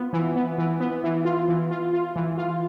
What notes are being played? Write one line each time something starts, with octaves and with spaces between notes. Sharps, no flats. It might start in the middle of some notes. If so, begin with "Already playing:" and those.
Already playing: B3 F4
E3
B3
E3
B3
E3
F4
E3
F4
F4
E3
F4